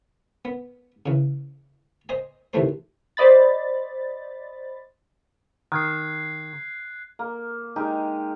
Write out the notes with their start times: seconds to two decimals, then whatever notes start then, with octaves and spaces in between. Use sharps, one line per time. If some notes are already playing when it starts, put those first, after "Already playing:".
0.45 B3
1.06 C#3 E3
2.09 C5 D#5 G#5
2.53 D#2 C3 E3 A3 C5
3.17 C5 D5 D#5 B5 A6
5.72 D#3 F#6 G#6 C7
7.19 A#3
7.76 G#3 D#4 G4 A#4